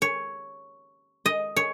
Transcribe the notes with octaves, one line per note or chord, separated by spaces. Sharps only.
C#5
D#5
C#5